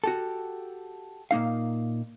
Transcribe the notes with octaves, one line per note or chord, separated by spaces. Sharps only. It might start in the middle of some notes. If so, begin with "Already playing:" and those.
F#4 G4 A4
A#2 A#3 D#4 F5